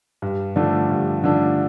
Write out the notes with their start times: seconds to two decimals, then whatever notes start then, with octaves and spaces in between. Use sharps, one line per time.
0.22 G2
0.56 D3 F3 A3 D4
0.90 G2
1.24 D3 F3 A3 D4